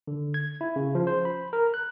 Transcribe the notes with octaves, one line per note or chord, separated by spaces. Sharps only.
D3
G#6
E4
C#3
F3
C5
B5
A#4
F#6